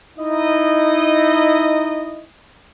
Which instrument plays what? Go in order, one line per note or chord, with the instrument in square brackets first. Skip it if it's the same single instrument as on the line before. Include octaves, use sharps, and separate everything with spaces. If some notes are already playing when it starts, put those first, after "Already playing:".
[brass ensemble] D#4 E4 D#5